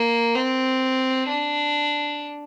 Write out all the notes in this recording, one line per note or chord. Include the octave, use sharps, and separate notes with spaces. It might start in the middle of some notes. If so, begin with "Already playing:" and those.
Already playing: A#3
C4
D4